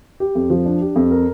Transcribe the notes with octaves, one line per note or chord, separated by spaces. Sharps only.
G4
F2
F3
D4
G4
F2
A#4